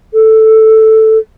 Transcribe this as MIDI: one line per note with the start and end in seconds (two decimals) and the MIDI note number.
0.14 1.18 69